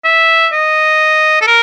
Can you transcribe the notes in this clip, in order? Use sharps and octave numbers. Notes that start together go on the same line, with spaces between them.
E5
D#5
A4
A#4